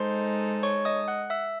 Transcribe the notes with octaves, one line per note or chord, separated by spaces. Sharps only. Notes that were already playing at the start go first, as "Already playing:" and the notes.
Already playing: G#3 D#4 A4 C5 C6
C#5 C#6
D#5 D#6
F#5 F#6
E5 E6